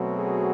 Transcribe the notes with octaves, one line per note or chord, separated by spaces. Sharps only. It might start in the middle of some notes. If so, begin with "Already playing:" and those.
Already playing: B2 F#3 A3 C4
F#4 G#4